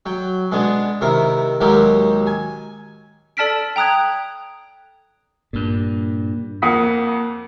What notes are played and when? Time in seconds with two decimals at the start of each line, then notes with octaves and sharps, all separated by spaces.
0.06 F#3 G5
0.52 G#3 B3 D4 G#4
1.01 C3 D#3 E4 A#4
1.61 D#2 F#3 G#3 D#4 G4 A#4
2.27 G#5
3.37 A4 D5 A5 F6 B6 D7
3.76 G5 A#5 D#6 F#6 G#6
5.53 G2 A#2
6.62 F2 A#3 F#5 D#6 B6